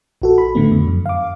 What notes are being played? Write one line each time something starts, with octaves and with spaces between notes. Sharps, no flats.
A#1 F#4 A4
B5
A2 D3 A3 B3
F2 D3
F#2
F5 D6